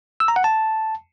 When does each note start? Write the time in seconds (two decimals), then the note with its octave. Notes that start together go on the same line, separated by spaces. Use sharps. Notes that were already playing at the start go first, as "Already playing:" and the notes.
0.20 E6
0.28 A#5
0.36 F#5
0.44 A5